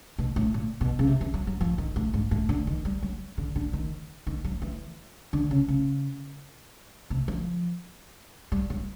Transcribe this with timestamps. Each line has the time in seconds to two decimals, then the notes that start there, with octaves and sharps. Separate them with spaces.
0.19 B2
0.36 A2
0.54 A#2
0.81 B2
0.99 C#3
1.07 C3
1.21 E3
1.34 F#3
1.47 F#3
1.61 F3
1.78 D#3
1.96 A2
2.14 G#2
2.31 A2
2.49 D3
2.67 D#3
2.85 G3
3.02 F#3
3.38 D3
3.56 D3
3.73 D#3
4.27 D#3
4.44 F#3
4.62 E3
5.33 D3
5.51 C#3
5.68 C#3
7.10 C3
7.28 F3
8.52 G3
8.70 F#3